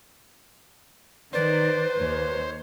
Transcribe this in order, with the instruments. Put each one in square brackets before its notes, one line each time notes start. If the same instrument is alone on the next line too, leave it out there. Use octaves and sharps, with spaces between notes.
[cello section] D#3 [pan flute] B4 [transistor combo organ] C5 [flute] D5
[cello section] D#2 [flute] C#5